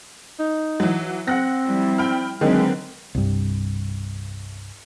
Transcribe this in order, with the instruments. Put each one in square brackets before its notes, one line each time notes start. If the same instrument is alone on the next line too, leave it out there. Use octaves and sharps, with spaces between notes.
[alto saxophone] D#4
[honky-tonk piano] E3 F#3
[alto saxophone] C4 [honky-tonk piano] F#5 F#6 A#6
[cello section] F3 G3 E4
[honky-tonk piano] G5 B5 F6
[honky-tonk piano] D3 D#3 A#3 [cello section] F#3 C4 B4 [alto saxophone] G#3
[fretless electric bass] C2 G2